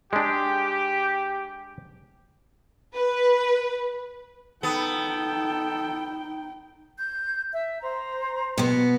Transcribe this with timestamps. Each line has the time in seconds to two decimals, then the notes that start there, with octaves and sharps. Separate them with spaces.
0.13 G#3 D4 G4
2.95 B4
4.63 B3 D#4 A4 G5
6.98 G6
7.52 E5
7.81 C5 A#5
8.58 B2 B3